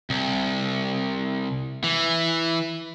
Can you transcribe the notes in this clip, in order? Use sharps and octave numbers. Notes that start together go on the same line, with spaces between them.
C2
E3